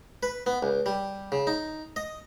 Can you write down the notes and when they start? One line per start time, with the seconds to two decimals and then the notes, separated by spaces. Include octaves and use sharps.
0.23 B4
0.46 B3
0.63 C#2
0.86 G3
1.32 C#3
1.47 D#4
1.96 D#5